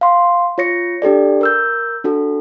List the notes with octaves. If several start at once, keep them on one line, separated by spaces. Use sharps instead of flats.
F5 C6
F4 C#5 A#6 C#7
D4 G4 A4 D5
A#4 E6 G6
D4 F#4 A4